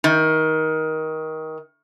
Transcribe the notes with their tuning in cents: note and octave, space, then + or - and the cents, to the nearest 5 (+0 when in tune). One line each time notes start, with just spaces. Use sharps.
D#3 +20